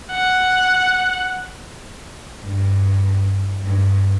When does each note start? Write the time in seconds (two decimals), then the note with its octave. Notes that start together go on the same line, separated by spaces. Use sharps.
0.11 F#5
2.43 G2
3.62 G2